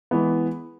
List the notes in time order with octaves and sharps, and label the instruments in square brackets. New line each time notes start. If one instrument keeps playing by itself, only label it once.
[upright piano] E3 G#3 B3